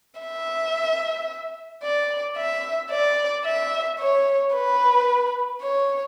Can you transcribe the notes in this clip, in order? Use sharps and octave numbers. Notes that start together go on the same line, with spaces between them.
E5
D5
E5
D5
E5
C#5
B4
C#5